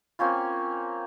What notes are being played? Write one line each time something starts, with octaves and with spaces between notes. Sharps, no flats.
A#3 C4 C#4 F4